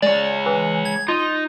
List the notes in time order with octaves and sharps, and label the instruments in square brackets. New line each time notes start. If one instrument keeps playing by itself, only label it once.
[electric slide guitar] G#3 C#5 [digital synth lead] D5
[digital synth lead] E3
G#6
[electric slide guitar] D#4 [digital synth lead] F4